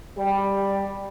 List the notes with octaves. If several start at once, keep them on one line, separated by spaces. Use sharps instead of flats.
G3